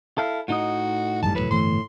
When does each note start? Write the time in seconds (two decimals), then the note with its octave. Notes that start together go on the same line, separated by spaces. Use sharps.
0.18 E4 A4 F5
0.48 A2 D#4 F#4 D#5
1.22 G#1 F#2 G3 A5
1.35 E1 D#2 A2 F#3 B4
1.51 G1 E3 A3 C6